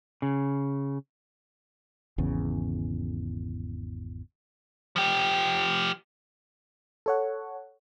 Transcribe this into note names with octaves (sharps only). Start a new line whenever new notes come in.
C#3
G#1 E2 C#3
F3 G4
A4 C#5 F#5